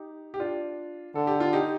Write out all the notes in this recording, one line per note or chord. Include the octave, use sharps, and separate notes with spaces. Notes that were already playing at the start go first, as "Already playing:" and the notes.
Already playing: D#4 G4
G4
D4 F4
D3 A4
G4
F4
D#4 G4